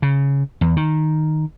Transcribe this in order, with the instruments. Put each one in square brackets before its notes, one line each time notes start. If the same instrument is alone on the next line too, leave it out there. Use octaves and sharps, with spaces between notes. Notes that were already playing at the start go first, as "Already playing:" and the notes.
[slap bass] C#3
E2
D#3